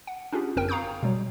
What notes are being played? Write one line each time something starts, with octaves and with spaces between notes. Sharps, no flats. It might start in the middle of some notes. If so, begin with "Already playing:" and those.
F#5
C#4 D4 F4 G4 G#4
G1 F#2 C4 A#4 G5
F5 A#5 C#6 D#6 G6
B2 F#3 G3